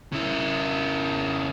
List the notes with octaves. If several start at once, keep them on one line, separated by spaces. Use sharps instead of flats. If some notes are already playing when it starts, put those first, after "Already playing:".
C#3 E4